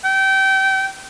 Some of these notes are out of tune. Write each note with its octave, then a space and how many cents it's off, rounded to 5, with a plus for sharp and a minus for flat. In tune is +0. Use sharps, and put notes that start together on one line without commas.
G5 -25